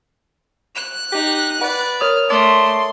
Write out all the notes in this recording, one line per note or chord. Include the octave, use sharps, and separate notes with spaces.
F#6
D#4 G4
B4 D5 F#5
A#4 C#5 D#6 F6
A3 D5 C6